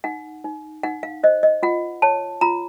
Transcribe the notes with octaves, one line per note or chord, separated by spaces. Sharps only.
D#4 F#5
D#4
D#4 F#5
F5
C5 D#5
D#5
F4 F#5
C#5 A5
F4 A#5